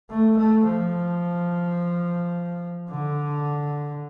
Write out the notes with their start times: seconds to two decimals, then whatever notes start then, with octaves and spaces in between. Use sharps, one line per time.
0.10 A3
0.37 A3
0.65 F3
2.90 D3